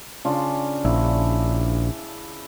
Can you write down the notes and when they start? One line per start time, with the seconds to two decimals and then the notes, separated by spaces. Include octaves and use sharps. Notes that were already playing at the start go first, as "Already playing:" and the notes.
0.25 C#3 D4 F4
0.85 A#1 E4